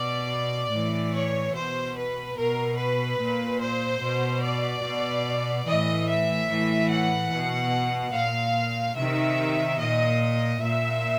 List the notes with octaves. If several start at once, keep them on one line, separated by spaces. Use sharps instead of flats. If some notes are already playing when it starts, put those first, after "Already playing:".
Already playing: B2 D5
A2 E3
C#5
B2 C5
B4
B2 A#4
B4
A#2
C5
B2
D5
B2
A2 E3 D#5
E5
A2 E3
F#5
B2
A#2 F5
C3 D#3 E5
A#2 D#5
A#2 E5